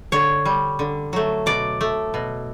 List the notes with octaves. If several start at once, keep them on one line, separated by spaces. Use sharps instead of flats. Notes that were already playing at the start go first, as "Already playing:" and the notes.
D3 C#5
G3
D3
F#3 A3
B2 D5
A3
B2